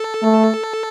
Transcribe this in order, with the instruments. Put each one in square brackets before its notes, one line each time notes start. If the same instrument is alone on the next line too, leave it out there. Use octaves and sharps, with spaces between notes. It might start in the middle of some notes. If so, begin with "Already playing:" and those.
Already playing: [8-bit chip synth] A4
[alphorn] A3